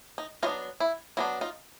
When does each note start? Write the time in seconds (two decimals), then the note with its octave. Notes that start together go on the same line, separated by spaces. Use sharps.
0.18 D#4
0.43 F#3 B3 D4 D#4 F4
0.80 E4
1.17 F#3 B3 D4 E4
1.41 D#4 F4